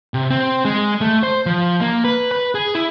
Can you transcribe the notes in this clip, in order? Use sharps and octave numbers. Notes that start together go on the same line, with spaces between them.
C3
C4
G#3
A3
C5
F3
A#3
B4
B4
G#4
E4